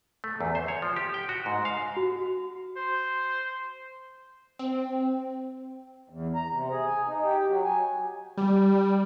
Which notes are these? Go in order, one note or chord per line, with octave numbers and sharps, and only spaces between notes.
A3
E2
C5
C#5
F3
G4
G5
F#4
G#2
F5
F#4
C5
C4
E2
A#5
C3
G#4
G#5
D#4
G4
F#3
G#5
G3